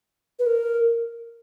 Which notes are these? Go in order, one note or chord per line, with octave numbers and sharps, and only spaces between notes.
B4
A#4